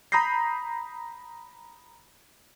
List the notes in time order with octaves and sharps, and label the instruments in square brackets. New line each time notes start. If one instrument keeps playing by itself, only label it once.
[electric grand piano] A#5 B5 D#6 G6 A#6 C7